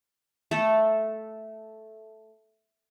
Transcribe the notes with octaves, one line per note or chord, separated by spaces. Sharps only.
A3 A4